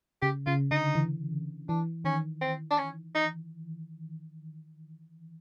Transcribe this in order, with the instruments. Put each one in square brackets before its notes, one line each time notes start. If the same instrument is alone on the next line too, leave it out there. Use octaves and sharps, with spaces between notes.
[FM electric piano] C#3 [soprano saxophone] G4
[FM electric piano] C#3 [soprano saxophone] F4
[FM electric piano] D3 [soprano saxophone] D#4
[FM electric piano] E3
[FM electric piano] E3 [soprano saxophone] D4
[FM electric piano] D#3 [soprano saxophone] C#4
[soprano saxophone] C4
D4
C#4
D#4